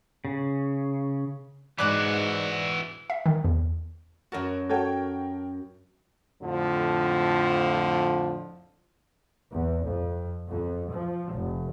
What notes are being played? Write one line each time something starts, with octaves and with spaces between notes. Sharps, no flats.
C#3
G#2 E3 F#4 D5 D6 F#6
E5
D#3
E2
F#2 F#4 A#4 A5
F#4 A4 A#4 C#5 G5
F2 A2 D3 F3
E2
F2
F2
F3
F1